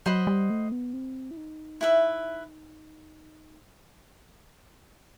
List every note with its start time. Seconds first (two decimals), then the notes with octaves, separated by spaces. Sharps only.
0.06 F#3 C5 D#5 F#5 B5
0.27 G3
0.50 A3
0.72 B3
0.94 C4
1.31 E4
1.37 D#4
1.81 E4 B4 E5